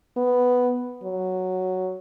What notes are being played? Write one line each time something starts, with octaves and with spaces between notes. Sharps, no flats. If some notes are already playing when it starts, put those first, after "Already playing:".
B3
F#3